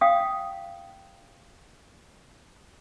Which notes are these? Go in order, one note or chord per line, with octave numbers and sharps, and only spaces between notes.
F5 G5 D#6